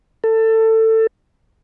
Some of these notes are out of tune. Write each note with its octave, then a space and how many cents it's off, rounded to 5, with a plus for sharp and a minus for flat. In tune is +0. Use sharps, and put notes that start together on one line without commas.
A4 +20